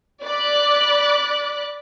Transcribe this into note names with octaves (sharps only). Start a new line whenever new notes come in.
D5 B5 D6 F#6